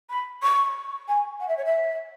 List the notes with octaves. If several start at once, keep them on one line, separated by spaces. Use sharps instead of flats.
B5
C#6
G#5
F#5
E5
C#5
E5